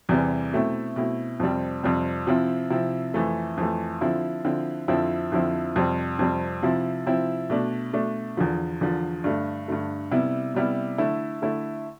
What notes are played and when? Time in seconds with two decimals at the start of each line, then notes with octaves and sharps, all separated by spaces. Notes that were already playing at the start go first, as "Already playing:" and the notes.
0.09 E2 C3 E3 G3 C4
0.52 B2 A3 C4 E4
0.96 B2 A3 C4 E4
1.40 F2 C3 G3 C4
1.83 F2 C3 G3 C4
2.27 C3 F3 C4 E4
2.70 C3 F3 C4 E4
3.14 F2 E3 A3
3.58 F2 E3 A3
4.01 D3 F3 C4 E4
4.45 D3 F3 C4 E4
4.88 F2 D3 F3 C4 E4
5.32 F2 D3 F3 C4 E4
5.76 F2 C3 G3 C4
6.19 F2 C3 G3 C4
6.62 C3 F3 C4 E4
7.06 C3 F3 C4 E4
7.50 B2 A3 D4
7.93 B2 A3 D4
8.37 E2 D3 F3
8.81 E2 D3 F3
9.24 G2 D3 A3
9.68 G2 D3 A3
10.11 C3 G3 B3 E4
10.55 C3 G3 B3 E4
10.98 D3 A3 E4
11.42 D3 A3 E4